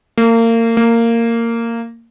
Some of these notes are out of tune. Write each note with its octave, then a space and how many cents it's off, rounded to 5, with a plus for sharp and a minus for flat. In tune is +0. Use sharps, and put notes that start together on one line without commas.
A#3 -30
A#3 -15